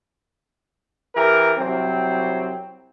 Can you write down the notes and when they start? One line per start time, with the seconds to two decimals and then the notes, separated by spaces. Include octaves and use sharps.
1.15 E3 G4 A#4
1.57 C2 F#3 C4